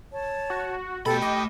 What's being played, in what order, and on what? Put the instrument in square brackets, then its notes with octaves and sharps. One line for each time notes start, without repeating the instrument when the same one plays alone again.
[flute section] C#5 A5
[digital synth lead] F#4
[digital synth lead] B2 [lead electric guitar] A3 B5 [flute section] G4 G5 [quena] A4
[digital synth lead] D#5 [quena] D6